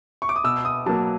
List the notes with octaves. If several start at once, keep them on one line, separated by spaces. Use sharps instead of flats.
C#6
D6
D#6
B2 E6
D#6
F#3 A#3 A5